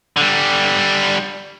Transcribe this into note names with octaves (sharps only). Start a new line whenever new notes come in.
D3 G3